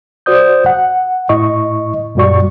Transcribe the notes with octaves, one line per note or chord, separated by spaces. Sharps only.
F#4 C5 D5 D#6 G6
F#5
A2 E4 D#5 C#6
F#2 A#2 G3 F#4 D5 C#6